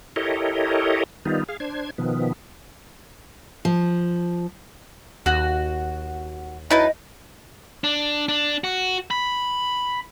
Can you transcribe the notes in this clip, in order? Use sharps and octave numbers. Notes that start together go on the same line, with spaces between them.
E4 G4 A4 A#4 C#5 D#5
D#3 G3 B3 D#4 F4
G#4 F5
D4 C5 G#6
B2 D#3 F3 B3
F3
D#2 F#4
F#3 D#4 E4 B4 D#5 A5
D4
D4
F#4
B5